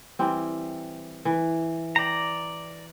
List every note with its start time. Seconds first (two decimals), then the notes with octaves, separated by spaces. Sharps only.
0.19 E3 G3 C4
1.25 E3
1.96 D5 G5 A#5